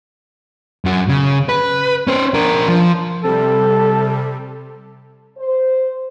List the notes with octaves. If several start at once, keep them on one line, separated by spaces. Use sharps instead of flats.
F#2 F#4
C#3
B4
C#4 C5
D4 A#4
F3
C3 G3 A4
C5